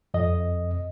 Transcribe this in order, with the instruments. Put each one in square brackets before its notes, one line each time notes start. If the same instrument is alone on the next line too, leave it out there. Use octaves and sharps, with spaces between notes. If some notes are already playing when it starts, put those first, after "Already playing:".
[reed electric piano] F2 D#5